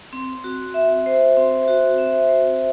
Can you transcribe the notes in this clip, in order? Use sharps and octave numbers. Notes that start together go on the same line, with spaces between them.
C4
F#4
E5
C5
C4
F#4
E5
C5